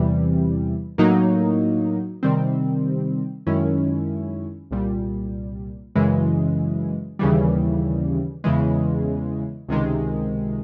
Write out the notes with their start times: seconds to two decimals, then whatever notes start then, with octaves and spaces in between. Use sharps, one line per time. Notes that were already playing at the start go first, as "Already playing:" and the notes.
Already playing: E2 C3 E3 G3
0.98 A2 F#3 A#3 D#4
2.23 C3 D#3 G3 C4
3.47 F#2 D#3 G#3 C#4 E4
4.71 C2 A#2 G3
5.95 F#2 C#3 E3 G#3
7.19 D#2 C#3 E3 G3
8.44 E2 C#3 E3 G#3
9.69 C#2 C3 D#3 G#3